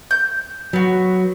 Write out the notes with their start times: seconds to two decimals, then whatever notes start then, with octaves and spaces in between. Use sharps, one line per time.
0.11 G6
0.73 F#3 B3 F#4